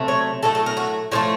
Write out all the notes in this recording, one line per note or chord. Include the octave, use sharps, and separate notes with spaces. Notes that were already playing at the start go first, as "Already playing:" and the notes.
Already playing: C3 F#3 A3
C#5
A2 F#3 A3 A4
A4
A#4
F#4
A2 F3 A3 C#5